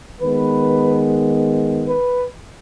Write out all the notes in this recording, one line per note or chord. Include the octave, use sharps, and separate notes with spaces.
D#3 G#3 B3 B4
B4